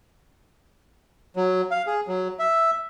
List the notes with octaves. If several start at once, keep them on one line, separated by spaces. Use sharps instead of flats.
F#3
F5
G#4
F#3
E5